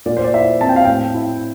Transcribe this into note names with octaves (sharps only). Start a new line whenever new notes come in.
A#2 D5
C5
D5
E4 E5
C4 A5
G5
F5
A2 G5
E4